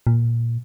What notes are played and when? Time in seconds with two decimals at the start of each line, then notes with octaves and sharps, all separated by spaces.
0.07 A#2